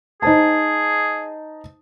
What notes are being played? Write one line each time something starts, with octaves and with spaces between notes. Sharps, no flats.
D#4 G#4 C5 A5